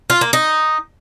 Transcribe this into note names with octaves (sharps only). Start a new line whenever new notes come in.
F4
A#3
D#4